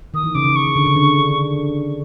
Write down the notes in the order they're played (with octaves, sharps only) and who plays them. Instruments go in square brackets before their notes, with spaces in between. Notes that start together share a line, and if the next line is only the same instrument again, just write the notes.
[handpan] D#3 [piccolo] D#6
[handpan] E3
[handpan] C#3 [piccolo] D6
[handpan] C#3
[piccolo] C#6
[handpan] D3
C#3
D3